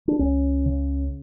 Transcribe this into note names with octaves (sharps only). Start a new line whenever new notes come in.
D4
C#2 C#4
C#3